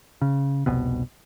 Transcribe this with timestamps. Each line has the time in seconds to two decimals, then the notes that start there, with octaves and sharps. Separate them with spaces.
0.22 C#3
0.66 F1 C2 B2